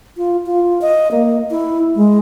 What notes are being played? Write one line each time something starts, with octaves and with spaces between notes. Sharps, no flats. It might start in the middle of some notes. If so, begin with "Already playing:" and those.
F4
F4
D#5
A#3
E4
G#3